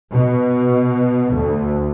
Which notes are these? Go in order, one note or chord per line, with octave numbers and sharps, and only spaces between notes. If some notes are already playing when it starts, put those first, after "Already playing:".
B2
D2